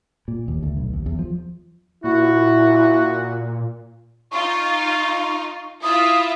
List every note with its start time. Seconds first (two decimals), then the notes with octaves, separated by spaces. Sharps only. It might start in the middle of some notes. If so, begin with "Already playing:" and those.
0.28 A#2
0.48 D#2
0.63 D2
0.77 B1
0.93 D#2
1.06 E2
1.19 F3
2.04 A#2 E4 F#4
4.32 D#4 F4 C#6
4.91 C#6
5.83 E4 F4 E5 D#6